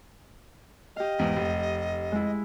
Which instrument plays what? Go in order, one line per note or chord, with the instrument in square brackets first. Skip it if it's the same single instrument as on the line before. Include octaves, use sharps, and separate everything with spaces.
[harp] G4 F5 [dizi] D#5
[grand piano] E2 G#2
F1
[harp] G#3 E4